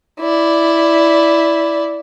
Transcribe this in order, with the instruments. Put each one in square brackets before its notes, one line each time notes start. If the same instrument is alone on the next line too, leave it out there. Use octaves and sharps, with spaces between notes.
[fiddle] E4 D5